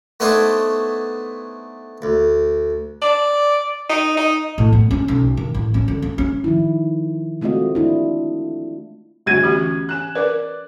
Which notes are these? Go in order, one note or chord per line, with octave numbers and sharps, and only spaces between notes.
A3 B3 D4 D#4 C5 C#5
D2
D5
D#4
D#4
A2
B3
C#4
B1
D#3
A1
C#4
D3
C#4
C#4
D#3 F3 E4
G#3 A3 C4 F4 F#4 D#5
D4 E4
D2 G3 B3 G#6 D#7
E3 C#4 G4
G#5 A#5 F#6 E7
A#4 B4 D5